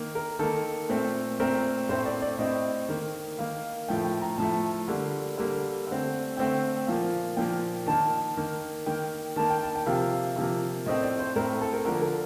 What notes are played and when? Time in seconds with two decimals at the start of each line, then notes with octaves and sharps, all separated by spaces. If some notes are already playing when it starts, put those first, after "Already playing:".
Already playing: D#3 A#3
0.15 A#4
0.39 D#3 A#3 A4
0.89 A#2 A3 C4
1.39 A#2 A3 C4 A#4
1.89 A2 A3 C4 C5
2.06 D5
2.22 D5
2.38 A2 A3 C4 D#5
2.89 D#3 A#3
3.38 D#3 A#3 F5
3.88 A2 F3 A3 G5
4.05 G5
4.22 A#5
4.38 A2 F3 A3 A5
4.88 D3 G3 A#3
5.38 D3 G3 A#3
5.87 D3 A3 C4
6.37 D3 A3 C4 G5
6.87 A#2 F3 A#3 F5
7.37 A#2 F3 A#3 G5
7.86 D#3 A#3 A5
8.37 D#3 A#3
8.86 D#3 A#3 G5
9.36 D#3 A#3 A5
9.50 G5
9.63 A5
9.75 G5
9.86 C3 F3 A#3 F5
10.36 C3 F3 A#3
10.86 A2 A3 C4 D#5
11.02 D5
11.19 C5
11.36 A2 A3 C4 A#4
11.61 A4
11.74 A#4
11.85 D3 F3 A#3 A#4
12.02 A#4